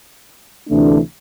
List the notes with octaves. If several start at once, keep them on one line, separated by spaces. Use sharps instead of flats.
D2 C3 E3 A3 D4